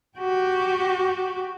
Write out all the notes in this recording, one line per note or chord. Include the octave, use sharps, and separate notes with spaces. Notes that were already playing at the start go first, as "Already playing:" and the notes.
F#4 G4